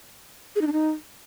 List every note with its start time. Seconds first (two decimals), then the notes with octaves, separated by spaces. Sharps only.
0.56 G#4
0.61 D#4
0.67 D4
0.73 D#4